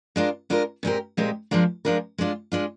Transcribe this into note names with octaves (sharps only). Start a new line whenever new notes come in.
G#3 D4 F4 A#4
G#3 D4 F4 A#4
A#2 G#3 C4 G4 A#4
A#2 G#3 C4 G4 A#4
F3 G#3 D4 F4 A#4
F3 G#3 D4 F4 A#4
G#3 D4 F4
G#3 D4 F4